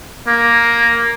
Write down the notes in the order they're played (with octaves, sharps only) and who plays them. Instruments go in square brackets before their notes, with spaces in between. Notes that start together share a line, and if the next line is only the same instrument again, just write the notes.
[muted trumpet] A#3